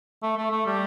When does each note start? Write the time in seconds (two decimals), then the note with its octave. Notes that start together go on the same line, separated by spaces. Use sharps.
0.23 A3
0.37 A3
0.51 A3
0.66 G3